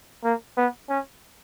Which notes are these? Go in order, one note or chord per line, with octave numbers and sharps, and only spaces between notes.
A#3
B3
C#4